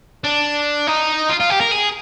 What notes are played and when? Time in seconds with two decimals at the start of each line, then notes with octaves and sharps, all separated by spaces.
0.24 D4
0.87 D#4
1.29 F4
1.40 F4
1.50 G4
1.61 A#4
1.71 G#4